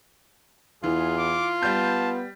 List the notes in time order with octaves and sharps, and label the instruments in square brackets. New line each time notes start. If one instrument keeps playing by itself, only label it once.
[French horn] E2 [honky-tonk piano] E3 [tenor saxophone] F4 [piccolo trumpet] G#4
[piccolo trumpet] D6
[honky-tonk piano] G3 G6 [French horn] B3 [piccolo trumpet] A5